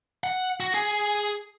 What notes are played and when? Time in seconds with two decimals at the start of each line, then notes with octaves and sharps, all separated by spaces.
0.24 F#5
0.60 F#4
0.74 G#4